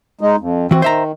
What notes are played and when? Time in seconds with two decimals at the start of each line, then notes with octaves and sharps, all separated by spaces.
0.21 G#3 D#4
0.40 F2
0.71 E3 C4 F#4
0.82 D#3 C5 E5 A#5